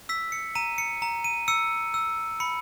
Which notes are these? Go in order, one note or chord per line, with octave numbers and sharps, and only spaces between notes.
E6 B6
C#7
A#5 D#7
C#7
A#5
D#7
E6 C#7
E6
B5 C#7